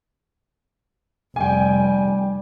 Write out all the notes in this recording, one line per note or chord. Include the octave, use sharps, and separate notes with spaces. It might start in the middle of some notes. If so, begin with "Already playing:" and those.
F1 G3 G5 G#5